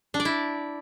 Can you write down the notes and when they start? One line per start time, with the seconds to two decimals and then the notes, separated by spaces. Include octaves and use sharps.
0.14 D4
0.20 D5
0.25 E4